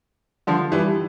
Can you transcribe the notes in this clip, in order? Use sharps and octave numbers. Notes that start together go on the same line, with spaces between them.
D3 F3
E3 G3